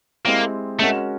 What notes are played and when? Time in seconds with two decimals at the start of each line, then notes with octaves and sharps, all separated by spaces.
0.25 G#3 A#3 C4 E4 G4
0.80 G#3 A3 C#4 F#4 A#4